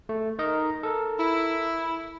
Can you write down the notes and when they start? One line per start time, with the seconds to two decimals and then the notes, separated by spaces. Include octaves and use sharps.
0.09 A3
0.39 D#4 A#4 D#5
0.83 A4 A#4
1.19 E4